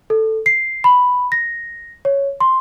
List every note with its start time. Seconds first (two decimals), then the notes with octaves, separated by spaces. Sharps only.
0.10 A4
0.46 C7
0.84 B5
1.32 A#6
2.05 C#5
2.40 C6